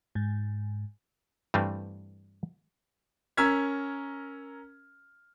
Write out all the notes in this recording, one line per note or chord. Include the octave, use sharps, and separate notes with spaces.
G#2
G2 E3 G3 A3 C4
C#4 A#4 E6 F6 G#6 B6